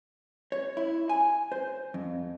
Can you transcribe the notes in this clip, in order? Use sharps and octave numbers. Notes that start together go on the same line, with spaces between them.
C#5
E4
G#5
C5
F2